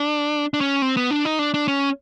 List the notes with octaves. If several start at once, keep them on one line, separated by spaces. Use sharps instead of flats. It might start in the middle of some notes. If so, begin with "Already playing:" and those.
Already playing: D4
D4
C#4
C4
B3
D4
D#4
D4
D4
C#4